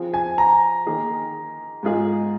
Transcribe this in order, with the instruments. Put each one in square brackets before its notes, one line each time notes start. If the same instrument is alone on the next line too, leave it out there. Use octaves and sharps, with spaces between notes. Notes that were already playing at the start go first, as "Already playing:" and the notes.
Already playing: [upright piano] F3 C4 F4 G#4
[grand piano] G#5
A#5
[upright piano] D#3 A#3 G#4
G#2 G#3 F4 G#4